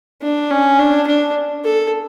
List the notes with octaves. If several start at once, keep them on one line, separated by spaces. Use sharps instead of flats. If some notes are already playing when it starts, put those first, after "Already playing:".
D4
C#4
D4
D4
A4